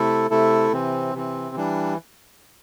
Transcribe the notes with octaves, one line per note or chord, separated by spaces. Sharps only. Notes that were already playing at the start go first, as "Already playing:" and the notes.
Already playing: C3 A3 E4 A4
C3 A3 E4 A4
C3 E3 C4
C3 E3 C4
E3 G3 D4